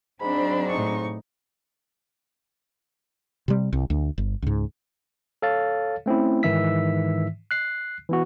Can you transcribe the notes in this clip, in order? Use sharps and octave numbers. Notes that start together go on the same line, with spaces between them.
G#2 F#3 C4 D4 B5
A2 D#4 C#6
C3 G3
C2
D2
G1
C#2 G#2
A4 C#5 F5 A6
A3 C4 C#4 E4
G#2 D#3 E3 E5 E6 B6
F#6 C7
E3 B3 F#4